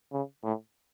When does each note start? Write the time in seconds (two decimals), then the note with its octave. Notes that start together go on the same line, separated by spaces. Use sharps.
0.12 C#3
0.44 A2